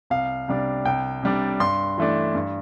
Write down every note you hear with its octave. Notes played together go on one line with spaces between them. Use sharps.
C2 F5
C3 G3 D4
C2 G5
C3 G3 D4
G2 C6
E3 A3 D4
G2